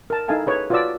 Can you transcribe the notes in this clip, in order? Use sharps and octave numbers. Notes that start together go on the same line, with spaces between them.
A#4 A5
D#4 E4 A4 F5 G#5 A5
G#4 B4 C#5
F4 F#4 B4 C#5 D5 E6